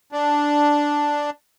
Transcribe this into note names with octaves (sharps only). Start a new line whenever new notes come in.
D4